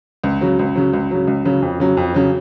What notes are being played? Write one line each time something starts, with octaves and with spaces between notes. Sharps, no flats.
C#2
C#3 F#3
C#2
C#3 F#3
C#2
C#3 F#3
C#2
C#3 F#3
F2
C#3 F#3
F2
C#3 F#3